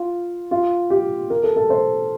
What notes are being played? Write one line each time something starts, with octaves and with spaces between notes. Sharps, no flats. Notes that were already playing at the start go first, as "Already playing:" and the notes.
Already playing: F4
F4
G4
A#4
A4
A4
C5